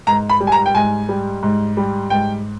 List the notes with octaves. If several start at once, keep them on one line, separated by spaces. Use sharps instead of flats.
G#2 A#5
B5
G3
G#5
A#5
G5
G#2 G#5
G3
G#2
G3
G#2 G5